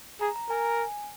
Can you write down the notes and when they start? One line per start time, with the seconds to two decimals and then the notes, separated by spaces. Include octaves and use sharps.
0.21 G#4 A#5
0.36 A#5
0.49 A#4 G#5